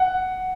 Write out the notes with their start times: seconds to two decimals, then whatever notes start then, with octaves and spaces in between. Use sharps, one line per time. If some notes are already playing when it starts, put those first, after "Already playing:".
Already playing: F#5